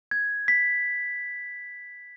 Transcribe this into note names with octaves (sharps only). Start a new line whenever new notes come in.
G#6
B6